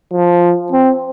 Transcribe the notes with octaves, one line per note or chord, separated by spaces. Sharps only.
F3
C4